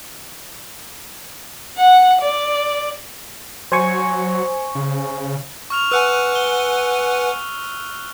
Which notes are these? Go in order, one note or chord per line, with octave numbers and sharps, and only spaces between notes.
F#5
D5
F#3 C5 G#5 C#6
C#3
C#6 F6 F7
B4 F#5 G#5 E6 F#6 D#7
G7